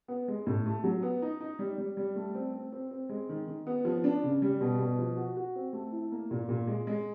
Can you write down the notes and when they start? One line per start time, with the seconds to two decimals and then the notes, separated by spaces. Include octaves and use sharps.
0.08 B3
0.28 G#3
0.47 A2
0.66 A3
0.84 F#3
1.02 B3
1.22 D#4
1.41 D#4
1.59 G3
1.78 G3
1.97 G3
2.16 A3
2.35 C4
2.54 C4
2.72 C4
2.91 C4
3.09 G#3
3.29 D#3
3.47 D#3
3.67 B3
3.85 F3
4.04 D4
4.24 C#3
4.42 G3
4.61 B2
4.79 B2
4.99 F3
5.17 F#4
5.37 F#4
5.55 C4
5.73 A3
5.92 E4
6.12 A#3
6.31 A#2
6.49 A#2
6.67 G#3
6.87 G#3